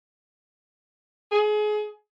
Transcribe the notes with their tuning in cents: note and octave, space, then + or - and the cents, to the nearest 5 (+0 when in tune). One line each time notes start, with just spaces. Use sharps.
G#4 +30